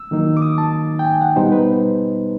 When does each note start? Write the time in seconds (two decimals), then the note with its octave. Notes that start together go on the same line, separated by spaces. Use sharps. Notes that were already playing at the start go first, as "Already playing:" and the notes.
Already playing: E6
0.11 D#3 F#3 A#3 D#4
0.37 D6
0.42 D#6
0.58 A5
0.99 G5
1.05 G#5
1.21 F#5
1.36 B2 G3 B3 D#4 C5
1.52 B4